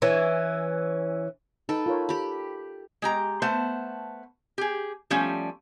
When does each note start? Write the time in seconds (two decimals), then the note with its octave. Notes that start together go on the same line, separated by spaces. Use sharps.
0.02 E3 C#4
1.69 D#4 A4 B4 G5
1.86 F4 A#4 C#5
2.09 G4 B5
3.02 G#3 G4 A#5
3.42 A3 B3 C5 A5
4.58 G4 G#4
5.10 F3 G3 A3 C#4